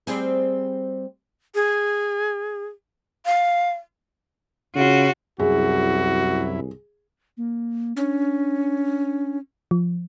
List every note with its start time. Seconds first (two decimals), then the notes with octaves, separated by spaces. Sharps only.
0.07 G3 C4 G#4
1.55 G#4
3.26 F5
4.75 C#3 F4 F#4
5.40 C2 F#2 E4 F#4 G#4
7.37 A#3
7.97 C#4 D4
9.71 F3